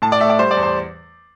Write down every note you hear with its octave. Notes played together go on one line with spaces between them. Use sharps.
A2 A5
D5
A3 E5
D5
G3 C5
D5
E2
C5